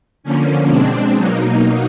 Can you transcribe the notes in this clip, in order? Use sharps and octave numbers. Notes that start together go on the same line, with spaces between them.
D3 F3 A#3 C#4
B2 G#3 C4 D4
B2 F#3 A#3 D#4